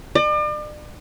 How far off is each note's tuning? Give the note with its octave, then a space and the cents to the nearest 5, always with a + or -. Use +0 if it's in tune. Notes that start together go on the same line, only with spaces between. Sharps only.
D5 +40